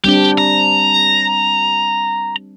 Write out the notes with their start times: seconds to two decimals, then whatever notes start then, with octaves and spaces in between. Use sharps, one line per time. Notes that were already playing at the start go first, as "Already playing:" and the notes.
0.04 G3 C4 D4 G4 G5
0.38 A#5